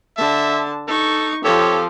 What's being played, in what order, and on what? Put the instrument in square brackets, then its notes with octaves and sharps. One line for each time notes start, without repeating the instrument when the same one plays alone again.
[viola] D3 A5 [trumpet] E5
[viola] D#4 C#6 [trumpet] A4
[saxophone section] F2 G4 A4 [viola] F3 [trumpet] C#5